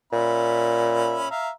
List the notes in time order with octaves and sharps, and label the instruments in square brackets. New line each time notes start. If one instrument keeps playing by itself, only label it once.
[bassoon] A#2 [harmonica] C#4 E5 B5
[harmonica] E5 F5 A#5